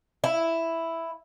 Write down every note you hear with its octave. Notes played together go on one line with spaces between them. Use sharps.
E4